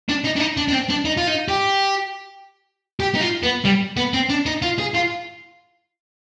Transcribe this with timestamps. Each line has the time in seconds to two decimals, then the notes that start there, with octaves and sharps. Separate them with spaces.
0.09 D4
0.24 D#4
0.36 D4
0.40 D#4
0.57 D4
0.68 D4
0.72 C4
0.90 D4
1.05 D#4
1.17 F4
1.27 D#4
1.48 G4
3.00 G4
3.15 D#4
3.21 F4
3.43 B3
3.65 G3
3.97 B3
4.14 C4
4.30 D4
4.46 D#4
4.62 F4
4.78 G#4
4.94 F4